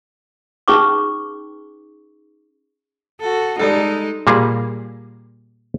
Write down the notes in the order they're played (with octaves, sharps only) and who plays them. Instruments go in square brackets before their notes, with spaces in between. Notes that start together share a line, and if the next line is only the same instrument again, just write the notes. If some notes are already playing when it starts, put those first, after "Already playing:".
[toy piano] C#4 D#4 G#4 B4 C#6 D6
[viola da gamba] F#4 A4
[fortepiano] G3 A4 [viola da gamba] G#3 D#4
[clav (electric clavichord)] A#2 G3 A#3 G#4